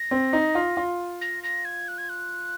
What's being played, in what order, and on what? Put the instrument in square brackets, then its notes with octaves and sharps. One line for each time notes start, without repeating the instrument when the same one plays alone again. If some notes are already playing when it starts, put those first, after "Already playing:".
Already playing: [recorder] A#6
[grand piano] C4
D#4
F4
F4
[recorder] A#6
A#6
G#6
F#6
G#6
F#6